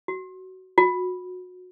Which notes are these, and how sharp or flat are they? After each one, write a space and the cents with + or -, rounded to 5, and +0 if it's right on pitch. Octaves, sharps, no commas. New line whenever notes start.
F#4 +15
F#4 -30